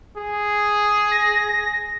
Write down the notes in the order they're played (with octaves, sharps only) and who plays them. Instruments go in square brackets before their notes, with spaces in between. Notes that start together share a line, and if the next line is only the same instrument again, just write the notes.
[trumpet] G#4
[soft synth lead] A#6